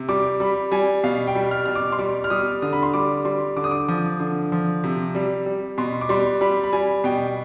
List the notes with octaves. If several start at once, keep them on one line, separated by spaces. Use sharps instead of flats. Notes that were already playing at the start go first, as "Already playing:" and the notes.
Already playing: C3
G3 D6
G3 B5
G3 G#5
B2 F5
G5
G3
F6
B2 F6
D6
C6
G3 D6
F6
G3 D#6
D3 D#6
B5
C6
G3 D6
G3 C6
D3 D6
D#6
D6
F3 D#6
D3
F3
C3
G3
G3
B2 C6
D6
G3 C6
G3 B5
B5
G3 G#5
B2 G5